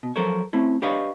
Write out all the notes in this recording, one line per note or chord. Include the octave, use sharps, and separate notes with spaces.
B2
F3 F#3 A4 A#4 C5 C#5
A3 C4 C#4 E4
D4 G4 B4 C#5 D#5 F5